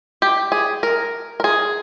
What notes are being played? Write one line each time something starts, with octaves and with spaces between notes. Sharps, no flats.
G4
G#4
A#4
A#4
G#4